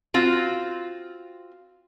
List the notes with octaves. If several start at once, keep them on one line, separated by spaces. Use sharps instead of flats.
C4 F4 F#4